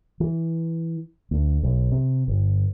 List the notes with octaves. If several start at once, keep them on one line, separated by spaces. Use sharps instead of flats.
E3
D2
B1
C3
G1